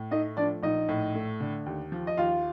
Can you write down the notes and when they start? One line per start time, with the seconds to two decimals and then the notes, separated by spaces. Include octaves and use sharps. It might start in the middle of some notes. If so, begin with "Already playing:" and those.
Already playing: A2
0.11 A3 D#4 D#5
0.37 F3 D4 D5
0.63 A#1 D#4 D#5
0.89 A2
1.15 A3
1.40 D3
1.66 D#2
1.92 F3
2.07 D#5
2.17 D#2 F4 F5